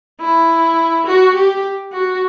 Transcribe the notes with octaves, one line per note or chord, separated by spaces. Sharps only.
E4
F#4
G4
F#4